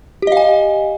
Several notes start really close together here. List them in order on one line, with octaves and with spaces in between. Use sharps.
G4 D#5 F5 G#5